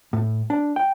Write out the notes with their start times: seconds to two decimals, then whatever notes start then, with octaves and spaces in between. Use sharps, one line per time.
0.13 A2
0.50 D4
0.76 G5